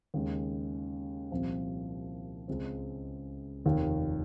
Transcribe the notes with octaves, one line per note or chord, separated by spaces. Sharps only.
D#2 C#3 G#3
C2 A#2 F3 C4
C#2 C#3 G#3 C4
F1 D#2 D#3 A#3